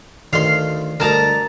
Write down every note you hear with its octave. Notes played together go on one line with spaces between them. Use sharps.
D2 D#3 A4 F5 C6
D2 G3 A#4 D#5 A5 A#5